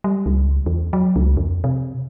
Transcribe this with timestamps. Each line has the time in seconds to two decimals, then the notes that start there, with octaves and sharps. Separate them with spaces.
0.04 G3
0.26 C#2
0.66 E2
0.93 F#3
1.16 C#2
1.37 F2
1.64 C3